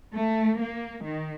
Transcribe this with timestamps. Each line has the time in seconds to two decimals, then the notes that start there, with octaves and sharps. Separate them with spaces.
0.14 A3
0.59 A#3
1.04 D#3